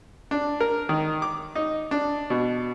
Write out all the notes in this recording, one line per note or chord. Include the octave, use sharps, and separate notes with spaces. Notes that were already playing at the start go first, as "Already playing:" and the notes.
D4
A#4
D#3
D6
D#4
D4
B2